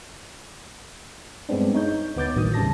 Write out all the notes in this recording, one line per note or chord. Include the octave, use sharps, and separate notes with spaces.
G2 G#3 B3 C4 D4
D#4 C#5 G6
D2 B3 D6 G6 A6
A1 A2 D#3 F#3 D#6
E2 C#3 G3 A5 A#6